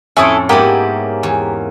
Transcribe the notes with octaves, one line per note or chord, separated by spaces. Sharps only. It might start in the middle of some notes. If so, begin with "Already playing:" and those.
F2 A2 C#4 E4 A4 C5 D#6
G#2 A#3 B3 E4 G4
E2